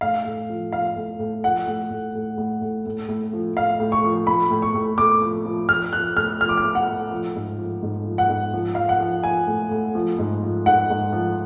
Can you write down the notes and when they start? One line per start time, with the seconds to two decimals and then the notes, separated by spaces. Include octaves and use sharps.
0.01 A2 F5
0.25 A2
0.50 F3
0.72 F3 F5
0.96 A2
1.19 A2
1.44 F3 F#5
1.67 A2
1.90 A2
2.15 A2
2.38 A2
2.62 A2
2.86 A2
3.09 A2
3.33 F3
3.56 A2 F5
3.80 A2
3.92 C#6
4.04 F3
4.27 F3 B5
4.50 A2
4.62 C#6
4.74 A2
4.98 A2 D6
5.21 F3
5.45 F3
5.69 F3 F6
5.93 F3 F#6
6.16 A2 F6
6.41 F3 F6
6.49 D6
6.57 F6
6.64 A2
6.75 F#5
6.88 A2
7.11 F3
7.35 G#2
7.58 F3
7.82 G#2
8.05 F3
8.18 F#5
8.29 G#2
8.54 F3
8.75 F3 F5
8.89 F#5
9.00 F3
9.23 F3 G#5
9.47 A2
9.71 A2
9.95 F3
10.19 G#2
10.43 F3
10.66 G#2 F#5
10.90 G#2
11.13 F3